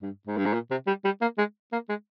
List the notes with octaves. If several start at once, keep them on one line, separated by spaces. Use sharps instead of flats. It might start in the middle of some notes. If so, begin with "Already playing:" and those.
G2
G#2
G2
G#2
A#2
C3
G3
G3
A#3
G#3
A#3
G#3